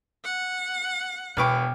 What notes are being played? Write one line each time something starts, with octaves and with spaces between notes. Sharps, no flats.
F#5
E1 B2 B4 G5 C#6 D6 F6